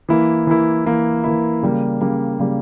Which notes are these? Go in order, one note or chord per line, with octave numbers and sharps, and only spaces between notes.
E3 A#3 E4
E3 A#3 E4
E3 A#3 E4
E3 A#3 E4
C#3 G3 A#3
C#3 G3 A#3
C#3 G3 A#3